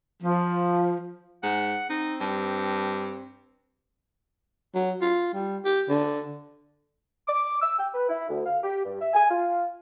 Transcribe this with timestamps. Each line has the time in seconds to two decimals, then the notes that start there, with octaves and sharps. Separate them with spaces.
0.23 F3
1.43 G#2 F#5
1.89 C4 D#4
2.20 G2
4.75 F#3
5.01 F4
5.33 G3
5.65 G4
5.89 D3
7.28 D6
7.62 E6
7.79 G5
7.94 B4
8.08 E4
8.29 D2
8.45 F5
8.63 G4
8.85 G2
9.01 E5
9.14 G#5
9.30 F4